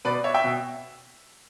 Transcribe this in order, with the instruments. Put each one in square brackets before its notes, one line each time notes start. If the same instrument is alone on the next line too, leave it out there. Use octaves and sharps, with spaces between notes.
[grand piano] B2 B4 D5
C#5 E5
E5 G5
B2